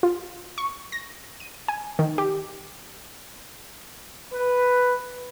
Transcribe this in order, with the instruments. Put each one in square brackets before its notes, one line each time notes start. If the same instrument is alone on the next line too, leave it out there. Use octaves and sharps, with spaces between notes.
[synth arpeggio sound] F4
C#6
A#6
D#7
G#5
D#3
G4
[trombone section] B4